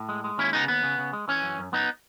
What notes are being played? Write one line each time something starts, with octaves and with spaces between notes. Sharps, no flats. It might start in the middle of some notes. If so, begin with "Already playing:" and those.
Already playing: A2
G#3
G#3
D#2 C#4 E4
C#3 B3 D#4
D#2 B3
C#3
C#3
G#3
E3 C#4
F#2
F#2
F#2 B3 D#4